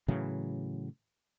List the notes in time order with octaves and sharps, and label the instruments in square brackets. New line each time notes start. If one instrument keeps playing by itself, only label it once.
[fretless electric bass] A2 C#3 E3 F#3